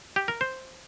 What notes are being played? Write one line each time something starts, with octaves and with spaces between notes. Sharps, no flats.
G4
A#4
C5